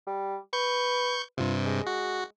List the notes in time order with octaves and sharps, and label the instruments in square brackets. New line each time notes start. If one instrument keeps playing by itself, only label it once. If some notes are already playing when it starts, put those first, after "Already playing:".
[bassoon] G3
[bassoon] B4 [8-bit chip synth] C#6 G6
[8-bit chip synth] G2 C3 [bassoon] F4
[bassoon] G#3
[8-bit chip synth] F#4